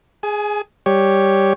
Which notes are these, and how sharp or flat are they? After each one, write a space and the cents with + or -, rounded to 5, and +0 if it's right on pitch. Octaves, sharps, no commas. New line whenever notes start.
G#4 +0 G#5 +35
G3 +0 G4 +0 C#5 +0